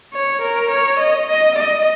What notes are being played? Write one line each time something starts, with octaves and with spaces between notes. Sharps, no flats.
C#5
A#4
C#5
D#5
D#5
D#5